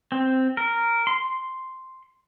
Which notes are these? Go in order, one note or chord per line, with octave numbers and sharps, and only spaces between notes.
C4
A#4
C6